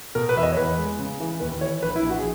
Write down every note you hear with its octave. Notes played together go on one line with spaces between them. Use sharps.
B2 A#4
B4
E2 E5
D#5
C#5
E2 B4
G#3
C#3
E3
D#2 B4
E3 C#5
A#1 B4
E4
A#1
F#4
G#4